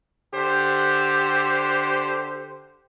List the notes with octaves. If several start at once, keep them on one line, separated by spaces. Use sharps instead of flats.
D3 G4 C5